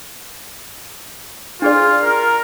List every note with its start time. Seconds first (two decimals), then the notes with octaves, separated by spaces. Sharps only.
1.62 D4 F4 G#4 D5
2.03 A#4